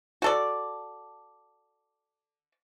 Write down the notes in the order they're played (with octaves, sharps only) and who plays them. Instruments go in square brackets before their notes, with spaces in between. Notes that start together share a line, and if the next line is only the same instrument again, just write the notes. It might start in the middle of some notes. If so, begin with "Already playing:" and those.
[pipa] F#4 A4 D5